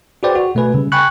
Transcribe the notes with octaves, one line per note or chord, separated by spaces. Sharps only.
F#4 G#4 B4 C5 D5 G5
F#4
B2 A3 F#4 B4 G#5
C#3 G3
G5 G#5 B5 C#6 F#6